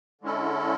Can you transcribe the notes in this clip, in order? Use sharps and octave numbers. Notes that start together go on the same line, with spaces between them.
D3 G#3 C#4 E4 A4